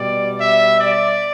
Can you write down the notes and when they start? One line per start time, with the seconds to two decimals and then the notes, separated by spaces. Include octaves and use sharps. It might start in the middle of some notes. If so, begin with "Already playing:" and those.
Already playing: B2 G3 D5
0.39 E5
0.77 D5